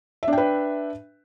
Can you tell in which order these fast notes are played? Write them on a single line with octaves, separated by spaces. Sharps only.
E5 D4 G5 B4